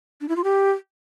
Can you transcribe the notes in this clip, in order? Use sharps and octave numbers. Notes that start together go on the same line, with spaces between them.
D4
E4
F4
G4